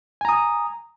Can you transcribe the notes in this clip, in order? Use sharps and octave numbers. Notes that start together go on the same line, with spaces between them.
G#5 A#5 D#6